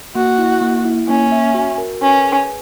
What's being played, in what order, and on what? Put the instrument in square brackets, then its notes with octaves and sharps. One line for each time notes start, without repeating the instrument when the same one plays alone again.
[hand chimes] A#3 [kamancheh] F#4
[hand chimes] E4
A#3
E4
[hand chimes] A#3 [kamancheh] C#4
[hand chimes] E5
F#4
A#4
[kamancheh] C#4 [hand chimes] B4
[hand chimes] G#4